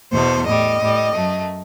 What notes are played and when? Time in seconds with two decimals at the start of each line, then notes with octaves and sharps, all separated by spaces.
0.12 E2 B2 A3 C5
0.46 A2 G3 D#5
0.80 A2 G3
1.14 F#2 F#3 A3